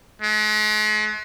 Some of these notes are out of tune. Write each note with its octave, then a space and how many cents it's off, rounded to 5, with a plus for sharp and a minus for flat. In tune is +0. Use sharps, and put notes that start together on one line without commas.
G#3 +45